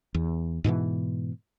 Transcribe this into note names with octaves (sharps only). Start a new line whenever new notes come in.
E2
G#2 B2 D#3 E3